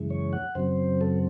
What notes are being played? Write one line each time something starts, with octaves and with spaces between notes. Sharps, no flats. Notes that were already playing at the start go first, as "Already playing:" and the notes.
Already playing: F#2 C#3 E3 G#3
C#5
F#5
F#2 C#3 F#3 C4 C5
A4